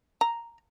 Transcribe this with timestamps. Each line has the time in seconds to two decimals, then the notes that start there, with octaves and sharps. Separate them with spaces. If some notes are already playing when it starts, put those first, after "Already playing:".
0.21 A#5